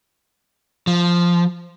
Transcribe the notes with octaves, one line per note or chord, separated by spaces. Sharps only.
F3